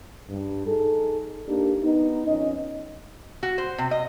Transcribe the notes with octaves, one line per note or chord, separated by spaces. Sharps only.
G2
D#4 G#4 A4
A#3 D4 D#4 G4
B3 D#4
F2 C#4 D#5
F#4
C5
C3
D#5